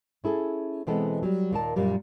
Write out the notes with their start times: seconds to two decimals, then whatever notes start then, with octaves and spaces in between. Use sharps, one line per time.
0.24 C#4 E4 G#4 A4
0.87 B2 E3 G#3 B3 C4 A4
1.23 F#3 G3
1.51 D#2 A#2 A#4 A5
1.76 F#2 A#2 G3 A#3